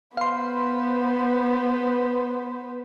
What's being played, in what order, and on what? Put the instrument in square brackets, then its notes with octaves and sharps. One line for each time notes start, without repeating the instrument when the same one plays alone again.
[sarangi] B3 [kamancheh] B4 C5 [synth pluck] F5 C6